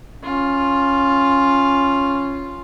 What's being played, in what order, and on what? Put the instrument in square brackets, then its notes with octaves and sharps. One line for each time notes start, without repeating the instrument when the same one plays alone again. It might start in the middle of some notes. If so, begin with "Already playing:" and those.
[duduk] C#4 [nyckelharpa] F4